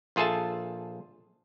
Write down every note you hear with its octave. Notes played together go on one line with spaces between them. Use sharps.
A#1 F4 G#4 A4 E5 A5